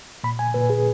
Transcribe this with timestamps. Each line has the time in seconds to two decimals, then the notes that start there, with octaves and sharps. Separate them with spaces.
0.24 A#2 B5
0.39 G#5
0.54 A#2 B4
0.70 G#4